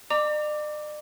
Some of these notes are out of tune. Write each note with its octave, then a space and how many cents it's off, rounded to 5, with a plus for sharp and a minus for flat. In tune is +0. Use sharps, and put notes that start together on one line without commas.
D5 +45 A#5 +0 D6 +0